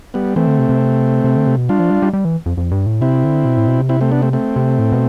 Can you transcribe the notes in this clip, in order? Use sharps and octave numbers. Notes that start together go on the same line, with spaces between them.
G3 B3
E3 A3 C4
D3
C3
C3
C3
D3
C3
B2
G3 D4 F4
F3
G3
G3
G3
E3
F2
F2
G2
A2
C3 C4 E4
D3
B2
A2
B2
C3
C4 E4
A3 C4
B3 D4
A3 C4
A3 C4
C3
A2
B2